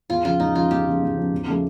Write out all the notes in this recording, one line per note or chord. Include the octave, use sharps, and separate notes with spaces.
E2 F4
C#3 F3 F4
E2 D#4
C#3 F3 F4
E2 G4
C#3 F3
E2
C#3 F3
E2
C#3 F3 A3